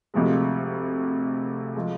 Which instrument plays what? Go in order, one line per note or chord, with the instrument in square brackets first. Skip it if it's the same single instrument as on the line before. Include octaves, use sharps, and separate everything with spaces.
[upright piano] D2 C3 F3 G#3
F3 G#3